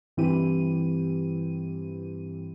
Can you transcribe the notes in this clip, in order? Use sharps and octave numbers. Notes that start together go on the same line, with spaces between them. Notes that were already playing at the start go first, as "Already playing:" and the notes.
G2 E3 C4 E4 G4 D#7